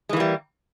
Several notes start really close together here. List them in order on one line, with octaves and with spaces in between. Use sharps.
G#3 E3 A#3 G3